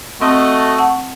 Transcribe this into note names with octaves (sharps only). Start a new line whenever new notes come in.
A3 C4 F#4 A4 D#5
F#5 A5 C#6